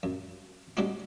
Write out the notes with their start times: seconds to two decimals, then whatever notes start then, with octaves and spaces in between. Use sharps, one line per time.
0.03 F#2
0.77 G3 G#3 C4 D4 D#4 F#4